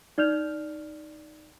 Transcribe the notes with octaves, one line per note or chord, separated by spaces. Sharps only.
D#4 D5 F6 G6 F7